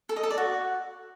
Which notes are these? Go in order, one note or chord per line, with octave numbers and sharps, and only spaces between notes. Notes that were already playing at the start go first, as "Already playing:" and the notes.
A4
D#5
A4
D5
F#4